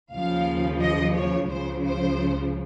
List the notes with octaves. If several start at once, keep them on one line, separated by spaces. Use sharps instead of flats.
D#2 C#3 F3 F5
D#5
C#5
C#2 C#3 F3 C5
C5